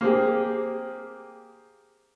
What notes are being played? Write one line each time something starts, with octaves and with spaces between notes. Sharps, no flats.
A#3 C4 G4 G#4